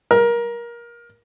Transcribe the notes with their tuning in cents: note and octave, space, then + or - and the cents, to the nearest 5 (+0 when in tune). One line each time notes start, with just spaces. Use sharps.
A#4 +20